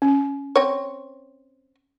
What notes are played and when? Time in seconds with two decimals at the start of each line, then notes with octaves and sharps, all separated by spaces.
0.02 C#4
0.56 C4 C#5